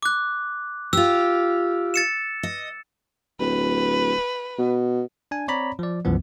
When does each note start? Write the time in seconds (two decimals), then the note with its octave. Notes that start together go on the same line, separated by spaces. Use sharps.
0.03 D6 F#6
0.93 F4 G4 E6
1.94 A6 C#7 E7
2.43 D#5
3.40 D1 B4
4.58 B2
5.31 D4 G#5
5.48 C4 C#5 D5 A#5 B5
5.79 F3 D5
6.05 C2 F#2 E3 F3 B3